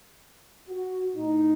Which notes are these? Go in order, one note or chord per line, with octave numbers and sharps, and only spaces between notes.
F#4
A2 D#4